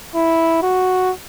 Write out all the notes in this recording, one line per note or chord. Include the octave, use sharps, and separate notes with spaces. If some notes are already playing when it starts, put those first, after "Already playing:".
E4
F#4